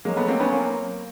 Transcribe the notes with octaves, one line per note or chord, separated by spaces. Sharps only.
F#3 G#3 A#3
A3 B3
A#3 C4
B3 C#4
A#3 C4